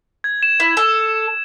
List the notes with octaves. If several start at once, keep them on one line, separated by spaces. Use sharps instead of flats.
G#6
E7
E4
A4